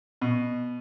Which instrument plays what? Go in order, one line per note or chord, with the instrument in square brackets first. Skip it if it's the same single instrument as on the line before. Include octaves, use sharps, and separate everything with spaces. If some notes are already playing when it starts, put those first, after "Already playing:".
[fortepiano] B2